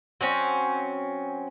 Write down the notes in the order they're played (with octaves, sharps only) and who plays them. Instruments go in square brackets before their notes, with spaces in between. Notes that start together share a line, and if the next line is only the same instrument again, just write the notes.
[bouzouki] F#3 C4 C#4